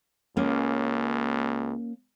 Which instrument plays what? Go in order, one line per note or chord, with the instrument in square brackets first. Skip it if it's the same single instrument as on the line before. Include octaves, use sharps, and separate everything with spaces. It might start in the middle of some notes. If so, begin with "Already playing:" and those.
[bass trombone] C#2 [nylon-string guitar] A#3 C#4